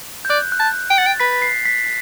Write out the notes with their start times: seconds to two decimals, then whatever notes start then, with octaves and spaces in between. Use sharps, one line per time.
0.25 G6
0.29 D5 F#6
0.52 F#6
0.60 A5
0.90 G5
0.98 F#5 A6
1.07 G5
1.20 B4 B6
1.42 C7
1.65 B6